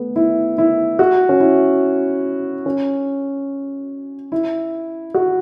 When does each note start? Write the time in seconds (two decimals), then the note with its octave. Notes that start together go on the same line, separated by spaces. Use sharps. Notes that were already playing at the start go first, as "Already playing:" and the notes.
Already playing: A3 B3
0.16 E4
0.58 E4
0.99 F#4
1.29 C#4
1.40 E4
2.66 C#4
4.32 E4
5.14 F#4